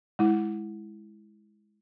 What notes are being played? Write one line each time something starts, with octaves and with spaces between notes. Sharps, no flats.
G#3 E4